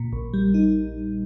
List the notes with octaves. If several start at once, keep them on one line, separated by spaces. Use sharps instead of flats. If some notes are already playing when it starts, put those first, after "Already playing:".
Already playing: A#2
A#1
G3
D#4